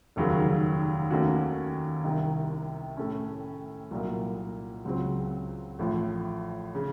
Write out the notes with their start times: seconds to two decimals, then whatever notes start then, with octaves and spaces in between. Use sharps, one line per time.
0.16 F1 D#2 C#3 F#3 A#3
1.10 D#2 D#3 A3 C#4 F#4
2.04 C2 C3 D#3
2.97 A2 A3 C#4
3.91 C2 A#2 F#3 A#3
4.85 C#2 C#3 F#3 C4
5.79 A1 A2 F3
6.75 C#3